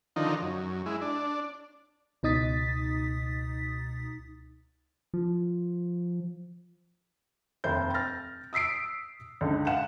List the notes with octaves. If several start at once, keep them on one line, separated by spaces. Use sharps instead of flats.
D3 D#3 F3 D#4
F#2
G#3 E4
D4
C#2 B2 D#4 D#6 A6 B6
F3
F1 D#2 C5 G6
F6 A6 A#6
D#6 E6 B6 C7 D7
C#2 D3 D#4
F5 F#5 E7